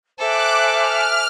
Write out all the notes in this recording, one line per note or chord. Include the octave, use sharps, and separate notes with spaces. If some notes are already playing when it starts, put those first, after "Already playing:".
A4 C5 E5 G#5 D6 F#6
F6